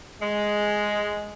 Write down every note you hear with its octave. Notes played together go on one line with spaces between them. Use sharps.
G#3